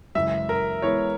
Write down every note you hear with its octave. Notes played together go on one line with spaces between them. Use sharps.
F#2 C#3 E3 G#3 E5
A#4
E3 G#3 B3 E4 C#5